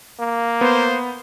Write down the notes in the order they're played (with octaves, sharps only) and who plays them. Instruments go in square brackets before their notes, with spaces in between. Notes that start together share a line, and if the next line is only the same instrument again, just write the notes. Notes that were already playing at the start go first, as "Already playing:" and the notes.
[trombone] A#3
[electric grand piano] B3 [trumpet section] C5